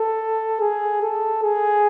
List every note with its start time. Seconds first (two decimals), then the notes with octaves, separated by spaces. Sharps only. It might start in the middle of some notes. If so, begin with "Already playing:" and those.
Already playing: A4
0.60 G#4
1.02 A4
1.43 G#4